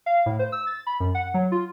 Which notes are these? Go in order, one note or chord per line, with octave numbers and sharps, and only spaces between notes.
F5
A2
C5
E6
A6
B5
F#2
F#5
F#3
F4